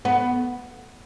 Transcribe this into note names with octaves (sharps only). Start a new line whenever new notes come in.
B3